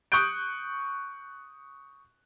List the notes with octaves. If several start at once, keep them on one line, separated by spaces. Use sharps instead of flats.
C#6 D#6 F#6 G6 D7